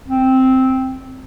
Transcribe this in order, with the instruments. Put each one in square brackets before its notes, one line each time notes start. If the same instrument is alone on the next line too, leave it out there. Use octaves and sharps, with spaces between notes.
[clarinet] C4